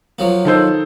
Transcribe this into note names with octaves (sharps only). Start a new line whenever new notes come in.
F3 F#3 A#3
D#3 A4 C5